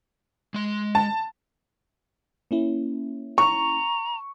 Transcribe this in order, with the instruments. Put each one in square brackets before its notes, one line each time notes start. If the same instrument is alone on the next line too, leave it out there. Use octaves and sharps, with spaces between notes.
[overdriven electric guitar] G#3 C6
[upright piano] A5
[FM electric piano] A#3 C#4 E4
[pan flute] A#5 [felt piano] C#6